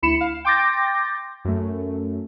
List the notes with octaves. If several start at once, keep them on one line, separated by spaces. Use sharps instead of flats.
D2 E4 B5 C#7 E7
F5
G5 C6 D6 G6 A6 A#6
F#2 A3